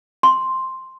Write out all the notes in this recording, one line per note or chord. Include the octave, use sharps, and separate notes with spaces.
C6